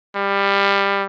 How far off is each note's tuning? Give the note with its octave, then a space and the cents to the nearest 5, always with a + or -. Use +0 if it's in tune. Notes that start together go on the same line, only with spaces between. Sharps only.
G3 +20